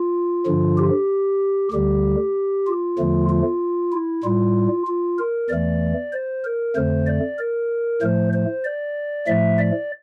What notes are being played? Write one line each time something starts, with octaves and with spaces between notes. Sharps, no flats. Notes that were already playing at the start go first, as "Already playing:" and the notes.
Already playing: F4
G2 D3 F3
G4
D2 D3 G3 G4
F4
E2 D3 F3 A3
F4
E4
A2 G3 F4
F4
A#4
E2 E3 A3 D5
C5
A#4
F2 D3 A3 C5
D5
A#4
A2 F3 A3 C5
C5
D5
A2 F3 A3 E5
D5